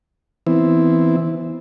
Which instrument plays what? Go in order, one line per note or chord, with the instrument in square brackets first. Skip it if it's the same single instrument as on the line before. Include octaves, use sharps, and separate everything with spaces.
[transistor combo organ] E3 B3 C4 E4